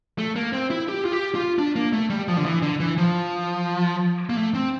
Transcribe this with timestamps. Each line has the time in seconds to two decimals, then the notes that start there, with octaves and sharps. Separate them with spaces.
0.18 A3
0.36 A#3
0.53 C4
0.70 E4
0.88 G4
1.05 F4
1.12 G4
1.35 F4
1.59 D4
1.76 A#3
1.93 A3
2.10 G3
2.28 F3
2.37 D3
2.46 E3
2.62 D3
2.80 E3
2.98 F3
4.29 A#3
4.37 A3
4.55 C4